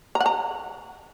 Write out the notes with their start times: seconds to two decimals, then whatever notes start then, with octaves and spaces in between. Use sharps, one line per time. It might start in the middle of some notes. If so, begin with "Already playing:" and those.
0.15 A#5
0.20 F#5
0.26 A#5